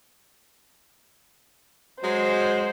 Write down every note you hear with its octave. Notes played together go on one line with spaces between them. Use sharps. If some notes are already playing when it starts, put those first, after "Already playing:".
F#3 G#3 C5